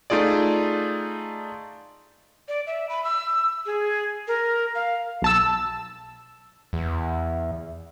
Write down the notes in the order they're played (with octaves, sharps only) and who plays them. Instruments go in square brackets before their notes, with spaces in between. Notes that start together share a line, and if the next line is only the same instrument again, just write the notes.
[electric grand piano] A3 D#4 F4 G#4 D5
[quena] D5
E5
B5
E6
G#4
A#4
F5
[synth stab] B1 A5 E6
[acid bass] E2